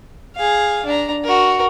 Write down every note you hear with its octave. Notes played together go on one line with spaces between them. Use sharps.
G#4 F5
D4 A#5
F#4 A#4